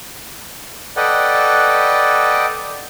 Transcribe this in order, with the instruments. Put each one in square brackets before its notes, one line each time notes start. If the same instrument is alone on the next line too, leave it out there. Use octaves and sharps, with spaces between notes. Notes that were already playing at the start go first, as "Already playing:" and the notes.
[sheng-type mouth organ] A4 B4 D5 D#5 F#5 G5